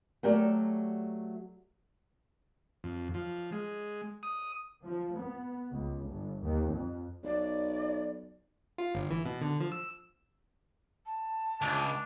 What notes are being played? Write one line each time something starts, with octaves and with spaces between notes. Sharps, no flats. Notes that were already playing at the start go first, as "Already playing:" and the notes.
F#3 A3 G4 A4 A#4 D5
F2
F3
G#3
D#6
F3
B3
C#2
G1
D#2
F2
B1 D5
F4
G1
E3
B2
D3
F3
E6
A5
C#2 D4